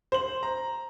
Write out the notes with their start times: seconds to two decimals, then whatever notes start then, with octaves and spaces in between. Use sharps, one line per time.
0.12 C5 F#7
0.43 A#5